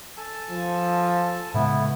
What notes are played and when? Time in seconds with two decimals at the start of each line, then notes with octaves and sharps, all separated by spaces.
0.17 A4 G#5 A5
0.50 F3
1.54 A2 C#3 G#3 A3 B3 E4